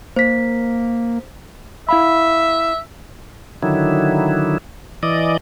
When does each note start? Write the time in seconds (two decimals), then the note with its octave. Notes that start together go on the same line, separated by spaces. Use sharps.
0.16 A#3 C5 B6
1.89 E4 E5 F5 B5
3.63 D3 D#3 F#3 E4
5.03 E3 D5 D#5